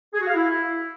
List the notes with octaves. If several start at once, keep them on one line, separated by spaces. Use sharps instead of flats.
G#4
F#4
F5
E4